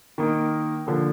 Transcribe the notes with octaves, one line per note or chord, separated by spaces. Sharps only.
D#3 A#3 D#4
D3 F3 A#3